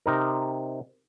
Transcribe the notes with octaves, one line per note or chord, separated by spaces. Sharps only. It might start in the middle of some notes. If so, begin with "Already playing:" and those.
C3 D#4 A#4